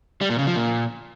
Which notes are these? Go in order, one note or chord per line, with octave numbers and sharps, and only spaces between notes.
G3
A#2
C#3
F3
A#2